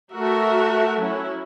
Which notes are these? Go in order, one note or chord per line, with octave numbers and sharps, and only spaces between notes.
A3 F#4 A#4 E5
F#3 C#4 E4